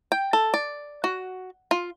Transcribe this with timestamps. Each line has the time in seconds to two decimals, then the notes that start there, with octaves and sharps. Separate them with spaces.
0.12 G5
0.33 A4
0.54 D5
1.04 F#4
1.71 F4